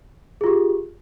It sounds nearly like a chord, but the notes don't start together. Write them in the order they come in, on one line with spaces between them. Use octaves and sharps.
G#4 F4 G4